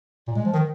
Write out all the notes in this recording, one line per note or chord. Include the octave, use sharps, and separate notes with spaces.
A#2
G#3
F3
D#3